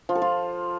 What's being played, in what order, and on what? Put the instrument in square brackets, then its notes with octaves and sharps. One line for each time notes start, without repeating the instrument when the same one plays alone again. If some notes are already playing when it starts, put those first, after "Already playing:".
[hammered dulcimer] F3
A4
F4